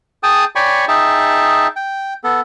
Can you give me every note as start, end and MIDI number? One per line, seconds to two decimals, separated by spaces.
0.23 0.45 68
0.23 0.45 79
0.23 0.45 81
0.23 0.45 87
0.56 0.85 73
0.56 0.85 74
0.56 0.85 79
0.56 0.85 80
0.56 0.85 83
0.56 0.85 85
0.88 1.67 63
0.88 1.67 68
0.88 1.67 76
0.88 1.67 79
0.88 1.67 81
1.76 2.14 79
2.24 2.41 59
2.24 2.41 69